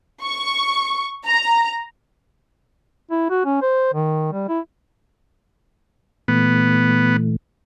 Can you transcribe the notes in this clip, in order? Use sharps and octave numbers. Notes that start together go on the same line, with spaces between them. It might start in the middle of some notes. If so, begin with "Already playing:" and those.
C#6
A#5
E4
F#4
C#4
C5
D#3
G3
E4
A#2 E3 A3 B3